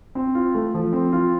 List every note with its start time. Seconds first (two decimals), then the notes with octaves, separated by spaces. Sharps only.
0.15 C4
0.35 F4
0.54 A3
0.74 F3
0.93 C4
1.12 F4